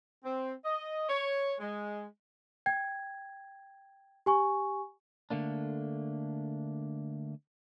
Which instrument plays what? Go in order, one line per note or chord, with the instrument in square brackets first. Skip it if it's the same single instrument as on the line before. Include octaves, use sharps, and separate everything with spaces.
[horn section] C4
D#5
C#5
G#3
[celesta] G5 G#6
G4 G#5 C#6
[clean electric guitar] D3 A3 A#3 D4